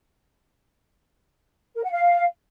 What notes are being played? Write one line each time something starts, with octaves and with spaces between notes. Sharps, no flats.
A#4
F#5
F5